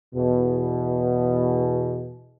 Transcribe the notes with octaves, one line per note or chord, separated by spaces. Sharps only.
E2 B2